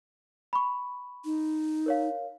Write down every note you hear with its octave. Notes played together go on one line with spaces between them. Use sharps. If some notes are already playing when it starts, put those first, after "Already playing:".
B5 C#6
D#4
A#4 C#5 F5